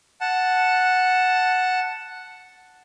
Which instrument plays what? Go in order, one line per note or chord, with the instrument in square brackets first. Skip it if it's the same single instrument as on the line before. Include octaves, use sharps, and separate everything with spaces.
[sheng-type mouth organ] F#5 A5